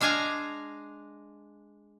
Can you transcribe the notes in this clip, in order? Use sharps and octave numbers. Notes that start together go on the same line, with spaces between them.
G#3 D4 F5 G#5 A#5